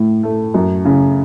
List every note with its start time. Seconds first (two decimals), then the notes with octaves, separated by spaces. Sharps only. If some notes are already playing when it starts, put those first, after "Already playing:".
Already playing: A2
0.23 A3
0.54 F#2
0.85 C#3